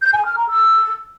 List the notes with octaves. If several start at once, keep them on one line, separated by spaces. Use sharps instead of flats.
G6
G#5
F6
A#5
E6